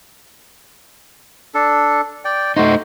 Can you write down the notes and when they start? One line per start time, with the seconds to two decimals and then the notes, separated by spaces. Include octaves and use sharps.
1.55 D4 A4
2.25 D5 G5
2.57 A3 D#4 F#4 C5